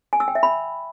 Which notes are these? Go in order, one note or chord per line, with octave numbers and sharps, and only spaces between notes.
G#5
E6
G5
E5
B5